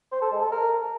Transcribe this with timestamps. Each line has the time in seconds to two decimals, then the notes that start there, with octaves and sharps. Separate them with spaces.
0.12 C5
0.22 A4
0.32 G#3
0.42 A4
0.52 A#4